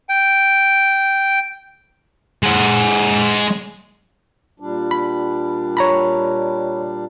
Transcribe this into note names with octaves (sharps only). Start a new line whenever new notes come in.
G5
G#3 F#5
A#2 G3 D4
B5
C#5 A#5 B5